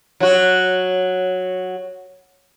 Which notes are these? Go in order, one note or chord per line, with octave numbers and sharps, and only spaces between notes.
F#3 F#4